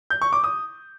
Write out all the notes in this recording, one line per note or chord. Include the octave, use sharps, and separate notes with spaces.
G6
C#6
D6
D#6